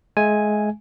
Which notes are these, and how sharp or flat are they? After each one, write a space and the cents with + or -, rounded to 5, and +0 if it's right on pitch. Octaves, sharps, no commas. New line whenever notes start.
G#3 +25 E5 +30 G#5 +0